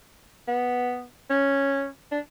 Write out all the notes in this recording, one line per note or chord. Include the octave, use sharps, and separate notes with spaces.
B3
C#4
D4